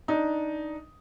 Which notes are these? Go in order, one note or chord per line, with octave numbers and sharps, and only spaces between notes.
D4 D#4